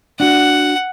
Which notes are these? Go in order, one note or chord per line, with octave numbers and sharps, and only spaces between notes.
D4 F#4 F#5